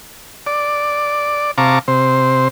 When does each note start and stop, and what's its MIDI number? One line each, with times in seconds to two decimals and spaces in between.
0.47 1.51 74
1.58 1.79 48
1.58 1.79 77
1.58 1.79 81
1.58 1.79 82
1.58 1.79 85
1.58 1.79 86
1.88 2.48 48
1.88 2.48 72